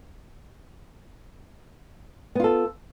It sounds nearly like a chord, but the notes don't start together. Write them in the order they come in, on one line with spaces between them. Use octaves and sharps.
B3 F4 A4